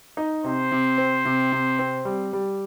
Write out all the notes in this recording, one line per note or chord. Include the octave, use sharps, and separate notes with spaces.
D#4
C3 C5
C3
C4
C3
C3
C4
G3
G3